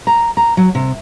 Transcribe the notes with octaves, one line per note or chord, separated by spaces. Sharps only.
A#5
A#5
F#3
C3